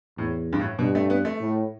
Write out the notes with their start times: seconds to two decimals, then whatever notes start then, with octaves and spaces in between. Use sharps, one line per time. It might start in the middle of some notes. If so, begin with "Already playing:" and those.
0.18 E2 A2
0.53 G2
0.59 A2
0.79 G2 B2
0.95 A3
1.10 B3
1.25 A3
1.41 A2